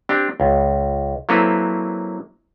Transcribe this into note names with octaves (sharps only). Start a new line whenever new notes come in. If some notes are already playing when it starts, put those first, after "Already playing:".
C4 D4 G4
C#2
F#3 A#3 C4 E4 A4 B4